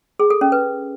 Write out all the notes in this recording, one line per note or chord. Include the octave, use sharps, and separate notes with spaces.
G#4
A4
C#4
B4